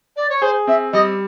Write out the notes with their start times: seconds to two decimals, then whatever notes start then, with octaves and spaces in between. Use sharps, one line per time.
0.16 D5
0.30 C#5
0.42 G#4 C5
0.67 C4 E5
0.93 G3 D#5